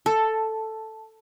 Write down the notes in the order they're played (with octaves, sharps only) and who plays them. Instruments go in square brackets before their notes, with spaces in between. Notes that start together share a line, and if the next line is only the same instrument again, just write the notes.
[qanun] A4 [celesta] A5